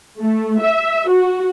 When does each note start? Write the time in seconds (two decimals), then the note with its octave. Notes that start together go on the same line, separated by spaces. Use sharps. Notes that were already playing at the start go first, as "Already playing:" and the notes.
0.20 A3
0.60 E5
1.08 F#4